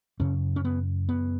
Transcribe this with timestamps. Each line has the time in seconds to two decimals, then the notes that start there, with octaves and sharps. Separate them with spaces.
0.20 F#2 C#3 C#4
0.56 C#4
0.65 B3
1.09 B3